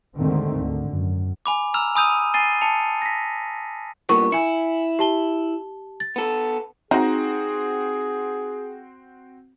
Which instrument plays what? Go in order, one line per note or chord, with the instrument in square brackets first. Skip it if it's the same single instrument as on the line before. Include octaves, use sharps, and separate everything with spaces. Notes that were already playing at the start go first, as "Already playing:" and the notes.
[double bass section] D#2 G#2 D3 D#3 A3 C4
D2 D3
F#2
[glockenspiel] G#5 B5 D6
A#5 E6 F6 F7
G#5 B5 D#6 E6 G6 D#7
G#5 A6 C7 D#7 G7
A5 C#7 F7
A#6 B6
[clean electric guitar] G2 A#2 B3 [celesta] A#4 C#6
[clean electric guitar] E4 [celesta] G#5 C#7
[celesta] G4 A5 G7
A6
[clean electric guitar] B3 A4
[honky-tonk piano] C4 F#4 [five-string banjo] D#4 A#5 [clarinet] G#4